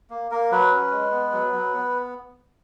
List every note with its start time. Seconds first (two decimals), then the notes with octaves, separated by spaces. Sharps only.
0.10 A#3
0.31 A#3 A#4
0.51 F#3 B4
0.72 C#4
0.92 G#3
1.12 B3
1.32 F#3
1.53 F#3
1.73 B3